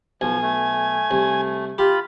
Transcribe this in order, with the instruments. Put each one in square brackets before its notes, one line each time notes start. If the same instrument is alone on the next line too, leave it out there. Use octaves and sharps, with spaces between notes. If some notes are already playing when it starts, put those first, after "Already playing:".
[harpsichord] B1 [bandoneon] F3 [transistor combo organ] G#5
[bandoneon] A3
[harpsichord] C2
[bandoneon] F4 B5 [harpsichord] G4